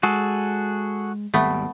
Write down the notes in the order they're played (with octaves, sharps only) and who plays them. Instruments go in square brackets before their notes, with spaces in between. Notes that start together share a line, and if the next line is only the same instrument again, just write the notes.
[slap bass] G#3 [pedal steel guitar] F#4 G#4 A4
[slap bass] G#1 D#2 G3 [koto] A3 B3